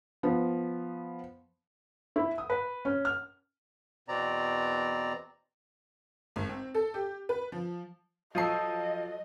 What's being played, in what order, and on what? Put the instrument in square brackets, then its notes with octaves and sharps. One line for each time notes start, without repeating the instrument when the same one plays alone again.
[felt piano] F3 B3
E4
D#6
B4
C#4
F6
[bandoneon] E2 B2 C4 D5 A#5
[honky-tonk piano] G#1
C4
A4
G4
B4
F3
[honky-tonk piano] F3 D#6 C7 [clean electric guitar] F#3 A4 [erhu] D#5